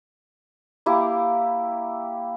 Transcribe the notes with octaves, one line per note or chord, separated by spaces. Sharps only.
A#3 E4 G4